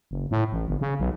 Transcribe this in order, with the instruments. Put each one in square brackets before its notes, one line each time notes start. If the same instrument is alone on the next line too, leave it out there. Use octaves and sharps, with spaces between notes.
[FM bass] F#1
A2
A1
G1
C#3
B1